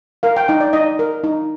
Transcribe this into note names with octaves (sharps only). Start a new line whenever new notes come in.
A#4 F5
G5
D#4 G5
D5
D#4 D#5
A#4
D#4